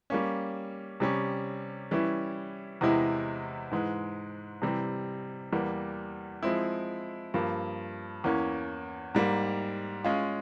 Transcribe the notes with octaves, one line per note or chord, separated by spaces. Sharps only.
G3 A#3 C#4
C3 G3 C#4
E3 G3 C#4 E4
E2 C3 E3 G#3 E4
G#2 E3 G#3
C3 E3 G3 C4
E2 E3 G3 A#3
F3 G#3 C4 E4
G2 F3 A#3
E2 E3 A#3 C#4
G#2 G3 A#3
G#3 C#4 F4